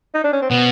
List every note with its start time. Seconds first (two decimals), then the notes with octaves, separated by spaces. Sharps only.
0.14 D#4
0.24 D4
0.33 C#4
0.42 C4
0.50 B2 B3